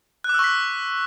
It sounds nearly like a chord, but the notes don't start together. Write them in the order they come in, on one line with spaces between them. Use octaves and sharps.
F#6 D6 E6 C#6 B6